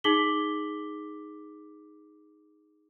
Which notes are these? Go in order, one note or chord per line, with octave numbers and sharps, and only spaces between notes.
D#4 G#4 D6 B6 F#7 G7